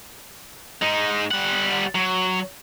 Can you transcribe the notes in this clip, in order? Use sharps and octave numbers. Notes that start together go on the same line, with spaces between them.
G#3 D#4
G3 F#5
F#3